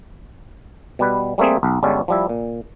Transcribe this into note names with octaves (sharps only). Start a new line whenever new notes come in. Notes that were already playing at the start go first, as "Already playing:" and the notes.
B2 G3 B4
G3 A3 A#3 C4 G#4
B1
G1 G3 G#3 C#4 A4
F3 G3 E4
A#2